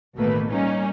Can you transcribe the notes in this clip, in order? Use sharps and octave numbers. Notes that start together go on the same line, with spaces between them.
A1 B2 D#3 A3 A#3 B4
G3 A#3 C#4 D#4